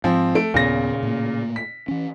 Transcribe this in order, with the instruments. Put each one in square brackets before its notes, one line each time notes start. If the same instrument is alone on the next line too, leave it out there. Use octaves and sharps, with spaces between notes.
[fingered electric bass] G#2 [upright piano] F3 C4
[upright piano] A3 D7
[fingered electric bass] D#2 B3 [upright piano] A#2 C#3 A#6
[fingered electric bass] A2 A#3
[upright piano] B6
[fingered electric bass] E3 C#4